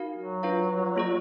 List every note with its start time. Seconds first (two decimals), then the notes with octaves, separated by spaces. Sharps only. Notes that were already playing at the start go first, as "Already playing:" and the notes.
Already playing: D#4 F#4 A#4 F5
0.17 F#3
0.43 D4 F4 B4 F5
0.96 A#3 F4 G#4 D5